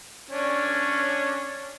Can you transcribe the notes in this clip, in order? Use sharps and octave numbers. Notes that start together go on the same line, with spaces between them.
C#4 D4 C#5